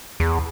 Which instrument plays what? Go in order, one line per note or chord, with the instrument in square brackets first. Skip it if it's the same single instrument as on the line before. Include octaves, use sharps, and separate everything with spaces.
[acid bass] E2